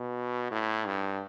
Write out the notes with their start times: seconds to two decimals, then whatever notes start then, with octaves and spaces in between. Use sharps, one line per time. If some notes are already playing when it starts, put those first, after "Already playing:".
Already playing: B2
0.51 A2
0.86 G2